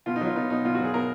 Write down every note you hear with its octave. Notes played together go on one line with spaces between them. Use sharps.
B2 F4
D#4
F#3 F4
B3 D#4
B2 D#4
B2 F4
F#4
F#3
G#4
B2 A#4